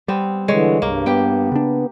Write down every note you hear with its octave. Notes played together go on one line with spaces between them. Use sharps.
G3 B3 C4
D3 E3 G#3 C#5
C2 G2 A#3
B3 G4 G5
C#3 D4